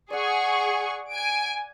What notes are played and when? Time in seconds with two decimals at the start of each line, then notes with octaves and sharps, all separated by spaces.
0.10 G#4 D5 F#5 C#6
1.11 G#5 D7